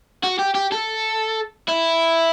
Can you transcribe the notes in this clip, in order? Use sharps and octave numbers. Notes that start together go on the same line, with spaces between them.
F#4
G4
G4
A4
E4